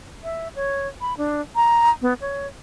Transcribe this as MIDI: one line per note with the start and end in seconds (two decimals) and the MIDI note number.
0.24 0.48 76
0.56 0.87 73
1.01 1.17 83
1.18 1.41 62
1.56 1.90 82
2.02 2.14 59
2.21 2.47 73